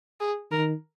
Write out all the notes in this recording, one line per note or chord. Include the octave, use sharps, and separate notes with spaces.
G#4
D#3 A#4